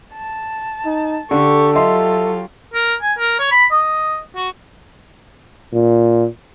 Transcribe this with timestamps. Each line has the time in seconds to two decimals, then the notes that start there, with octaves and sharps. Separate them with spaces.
0.13 A5
0.85 D#4
1.31 D3 G4 A4 C#6
1.75 F#3 F4 G4 D#5 E5 C6
2.74 A#4
3.02 G#5
3.18 A#4
3.39 C#5
3.51 B5
3.71 D#5
4.36 F#4
5.73 A#2